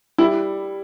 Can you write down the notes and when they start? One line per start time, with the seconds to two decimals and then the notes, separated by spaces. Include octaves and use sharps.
0.18 G3 E4